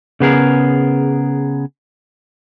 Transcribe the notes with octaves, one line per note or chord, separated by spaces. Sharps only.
C#3 B3 G#4 A#4